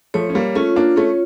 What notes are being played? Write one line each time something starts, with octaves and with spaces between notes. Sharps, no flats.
F3 A3 C#5
C#4
G3 A#3
A3 C#4 F4
A#3 D4
A3 C#4 C#5